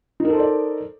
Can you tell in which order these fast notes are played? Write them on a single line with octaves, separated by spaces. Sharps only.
D#4 A#4 A4 C5 D5